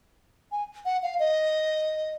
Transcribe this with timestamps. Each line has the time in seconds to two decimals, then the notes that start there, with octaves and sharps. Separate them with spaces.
0.52 G#5
0.85 F#5
1.03 F5
1.19 D#5